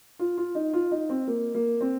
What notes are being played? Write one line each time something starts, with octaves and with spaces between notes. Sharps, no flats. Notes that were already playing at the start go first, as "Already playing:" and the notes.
F4
F4
D#4
F4
D#4
C4
A#3
A#3
C4